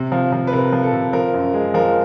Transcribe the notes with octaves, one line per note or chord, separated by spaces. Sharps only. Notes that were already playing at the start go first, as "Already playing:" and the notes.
Already playing: C3
F3
F3
B4
C3 A#4
F3
A4
C3
F3 A#4
F#2
G#3
F3 A#4